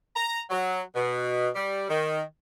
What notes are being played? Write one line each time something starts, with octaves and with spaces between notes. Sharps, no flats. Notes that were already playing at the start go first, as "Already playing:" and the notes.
A#5
F#3
B2
G3
D#3